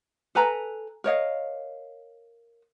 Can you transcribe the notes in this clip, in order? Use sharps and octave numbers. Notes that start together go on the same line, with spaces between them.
A4 B4 G#5 A#5
A#4 C#5 D#5 F5